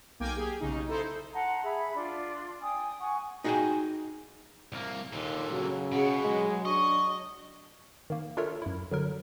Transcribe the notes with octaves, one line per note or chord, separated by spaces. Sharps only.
B1 A#3 G5 G#5 D6 G#6
G4 G#4
B1 C#3 D#4
D#4 E4 A4 C5
F#5 A5 A#5 C6
G#4 E5 B5
D4 F4 D5 C6
G5 G#5 D#6
F#5 G#5 C#6
D#4 F#4 G#4 C5 G5 G#5
C2 A#3
D#2 A#2 D3
C#3 F#3
B2 C#4 G#4 F#5
F#3 G#3
D4 D#5 C#6
D#3 A#3
D4 F4 A4 A#4 C#5 E5
F#2 E4
D3 F#3 A#4